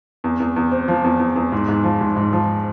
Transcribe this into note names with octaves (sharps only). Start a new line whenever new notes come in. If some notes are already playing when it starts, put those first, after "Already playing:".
E2
E2
E2
C4
F3
E2
E2
E2
G#2
G#2
F3
G#2
G#2
F3